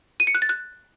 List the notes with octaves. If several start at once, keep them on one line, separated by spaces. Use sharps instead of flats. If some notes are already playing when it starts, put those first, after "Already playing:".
D#7
C#7
F#6
A6
F#6